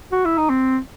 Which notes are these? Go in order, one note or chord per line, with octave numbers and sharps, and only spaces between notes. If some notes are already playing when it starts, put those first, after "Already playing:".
F#4
E4
D#4
C4